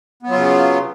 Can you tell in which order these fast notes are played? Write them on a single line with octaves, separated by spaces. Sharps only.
B3 F#3 F4 C#3